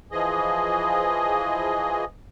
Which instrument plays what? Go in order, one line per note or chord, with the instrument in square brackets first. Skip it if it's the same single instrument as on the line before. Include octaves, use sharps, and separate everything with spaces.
[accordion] E3 F3 G#4 D#5